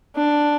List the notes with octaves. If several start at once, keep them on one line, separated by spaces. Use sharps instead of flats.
D4